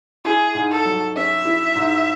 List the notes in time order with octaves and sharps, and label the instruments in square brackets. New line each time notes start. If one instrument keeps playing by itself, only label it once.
[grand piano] E4 [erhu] G#4
[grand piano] G#2
[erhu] A4
[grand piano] F#3
[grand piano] C#4 [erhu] E5
[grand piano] E4
G#2